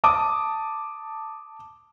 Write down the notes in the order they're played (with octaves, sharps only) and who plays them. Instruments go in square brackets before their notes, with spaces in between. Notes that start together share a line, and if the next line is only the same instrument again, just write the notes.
[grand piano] A5 D6 D#6